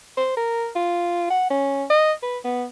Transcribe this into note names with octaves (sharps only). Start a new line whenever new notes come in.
C5
A#4
F4
F#5
C#4
D#5
B4
B3